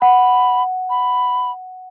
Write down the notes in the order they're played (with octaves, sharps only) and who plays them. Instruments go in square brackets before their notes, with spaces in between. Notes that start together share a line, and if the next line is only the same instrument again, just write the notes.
[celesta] F#5 [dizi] B5
[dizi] B5